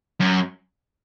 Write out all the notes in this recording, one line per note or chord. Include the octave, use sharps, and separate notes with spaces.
F#2